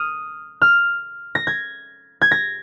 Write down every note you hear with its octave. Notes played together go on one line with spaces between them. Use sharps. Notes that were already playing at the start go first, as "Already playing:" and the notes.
Already playing: D#6 F6
F6
A#6
G#6
G#6
A#6